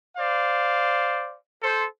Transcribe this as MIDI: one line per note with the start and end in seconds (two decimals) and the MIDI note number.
0.17 1.36 72
0.17 1.36 74
0.17 1.36 77
1.63 1.84 69
1.63 1.84 72